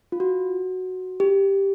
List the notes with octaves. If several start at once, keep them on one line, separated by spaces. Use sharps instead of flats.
F4
F#4
G4